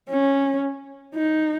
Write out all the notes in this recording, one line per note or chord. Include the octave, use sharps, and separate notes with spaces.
C#4
D#4